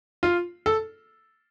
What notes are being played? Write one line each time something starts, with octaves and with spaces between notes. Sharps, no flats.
F4
A4